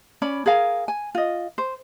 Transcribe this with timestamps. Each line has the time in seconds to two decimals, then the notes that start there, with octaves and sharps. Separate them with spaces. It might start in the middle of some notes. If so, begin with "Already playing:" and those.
0.22 C#4 D5 B5
0.46 G#4 A#4 F5 G#5
0.88 G#5
1.15 F4 D#5
1.58 C5